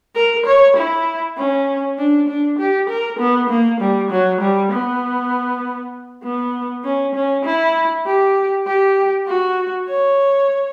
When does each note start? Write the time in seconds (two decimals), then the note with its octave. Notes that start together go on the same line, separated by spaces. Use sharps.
0.16 A#4
0.46 C#5
0.77 E4
1.38 C#4
1.98 D4
2.29 D4
2.59 G4
2.89 A#4
3.20 B3
3.50 A#3
3.80 G3
4.11 F#3
4.41 G3
4.72 B3
6.24 B3
6.84 C#4
7.15 C#4
7.46 E4
8.07 G4
8.67 G4
9.28 F#4
9.89 C#5